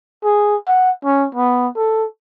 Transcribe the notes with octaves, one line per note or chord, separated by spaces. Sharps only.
G#4
F#5
C#4
B3
A4